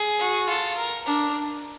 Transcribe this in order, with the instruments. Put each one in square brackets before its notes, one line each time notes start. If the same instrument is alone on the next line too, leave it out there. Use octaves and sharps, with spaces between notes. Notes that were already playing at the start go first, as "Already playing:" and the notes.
Already playing: [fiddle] G#4
[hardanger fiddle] F#4
[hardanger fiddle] F4 [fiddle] A4
[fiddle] A#4
[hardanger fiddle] D4 [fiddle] A#4